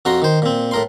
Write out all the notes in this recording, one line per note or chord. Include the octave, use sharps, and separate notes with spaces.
F2 F#4 A#5 C6
D#3 C5
A#2 C4
A2 A#4 C6